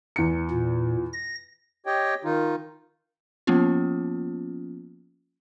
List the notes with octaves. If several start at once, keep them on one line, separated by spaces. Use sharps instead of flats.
E2 C#7
A#2
A#6
G4 C#5 D#5 G5
D#3 D#4 F4
F3 A#3 B3 C#4 F4